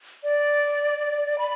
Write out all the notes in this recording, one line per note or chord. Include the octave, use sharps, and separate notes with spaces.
D5
B5